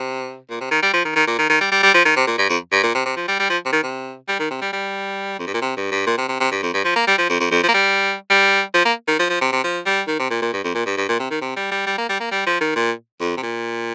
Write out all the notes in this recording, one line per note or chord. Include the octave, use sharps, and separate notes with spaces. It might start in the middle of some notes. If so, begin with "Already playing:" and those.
Already playing: C3
A#2
C3
D#3
G3
F3
D#3
D#3
A#2
D#3
D#3
G3
G3
G3
F3
D#3
C3
A#2
G2
F2
G2
A#2
C3
C3
F3
G3
G3
F3
C3
D#3
C3
G3
D#3
C3
G3
G3
F2
G2
A#2
C3
G2
G2
A#2
C3
C3
C3
G2
F2
G2
F3
A#3
G3
F3
F2
F2
F2
F3
A#3
G3
G3
F3
A#3
D#3
F3
F3
C3
C3
F3
G3
D#3
C3
A#2
A#2
G2
F2
A#2
G2
G2
A#2
C3
D#3
C3
G3
G3
G3
A#3
G3
A#3
G3
F3
D#3
A#2
F2
C3
A#2